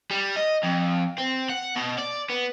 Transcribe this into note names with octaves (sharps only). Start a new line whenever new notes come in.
G3
D#5
F2
C4
F#5
B2
D5
B3